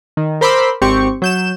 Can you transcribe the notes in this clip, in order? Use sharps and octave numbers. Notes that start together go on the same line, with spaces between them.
D#3
A#4 C5 B5 C6 D6 E6
G#1 C4 G4 C#6
F#3 G6 E7